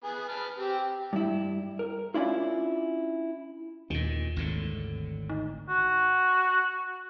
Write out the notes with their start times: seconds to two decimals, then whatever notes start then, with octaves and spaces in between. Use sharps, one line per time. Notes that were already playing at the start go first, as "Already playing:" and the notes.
0.04 B3 G#4
0.28 B4 A5 F6
0.58 C4 G4
1.13 G2 E4
1.79 A#4
2.14 C#4 D4 E4 F4
3.90 D#2 A#2 D#3
4.36 G#1 A2 D3
5.29 D#4
5.69 F#4